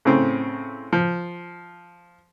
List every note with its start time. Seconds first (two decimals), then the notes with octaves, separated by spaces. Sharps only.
0.05 A2 C#3 C4
0.93 F3